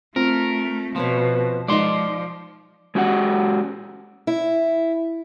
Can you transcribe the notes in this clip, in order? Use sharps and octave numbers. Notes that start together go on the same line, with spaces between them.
A3 C4 F4 A#4
B2 F3 B3 B4 C#5
F3 G#3 D#4 F4 D5 D#5 C6
G#3 C#4 F#4 G4 C#5 F#5
E4